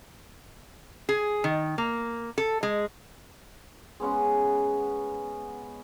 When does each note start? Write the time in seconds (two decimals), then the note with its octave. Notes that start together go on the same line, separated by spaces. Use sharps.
1.09 G#4
1.44 D#3
1.78 A#3
2.38 A4
2.63 G#3
4.00 G#3 B3 C#4 F#5